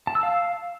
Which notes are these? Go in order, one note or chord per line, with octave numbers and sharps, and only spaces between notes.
A5
E6
F5